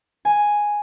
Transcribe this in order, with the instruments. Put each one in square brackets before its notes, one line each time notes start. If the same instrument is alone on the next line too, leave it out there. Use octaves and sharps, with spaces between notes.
[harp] G#5